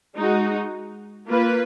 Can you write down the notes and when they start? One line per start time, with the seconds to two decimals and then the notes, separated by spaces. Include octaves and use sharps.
0.16 G#3 D#4 F#4
1.27 A#3 F4 B4